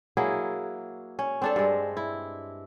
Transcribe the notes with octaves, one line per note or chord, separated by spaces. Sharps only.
F#3 A#3 E4 G#4
C#4
C4 D4 A4
G2 G#3
E4